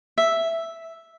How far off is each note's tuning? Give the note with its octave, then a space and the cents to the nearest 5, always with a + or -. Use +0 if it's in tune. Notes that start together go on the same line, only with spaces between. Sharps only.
E5 +0